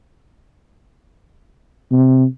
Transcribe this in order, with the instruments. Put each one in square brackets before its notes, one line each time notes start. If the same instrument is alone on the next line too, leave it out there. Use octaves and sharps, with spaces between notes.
[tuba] C3